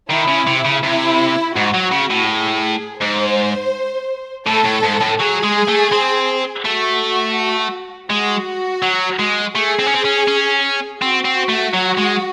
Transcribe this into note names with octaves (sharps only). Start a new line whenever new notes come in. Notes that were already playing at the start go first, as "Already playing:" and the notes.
D#3 E4
C#3
C3
C#3
C3 E4
G#2 F#4
F#3
C#3
A2
G#4
G#2 C5
A2 A4
A2
G#2
A2
F#3 G#4
G#3
A3
C4
A3 F#4
G#3 F#4
F#3
G#3
A3 G#4
C4
C#4
C4
C#4
C#4
C4 F#4
C4
A3
F#3
G#3